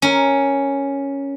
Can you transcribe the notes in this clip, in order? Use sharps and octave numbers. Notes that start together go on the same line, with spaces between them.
C#4 A#4